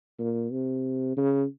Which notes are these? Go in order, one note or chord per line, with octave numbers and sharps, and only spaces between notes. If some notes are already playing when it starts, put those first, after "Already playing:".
A#2
C3
C#3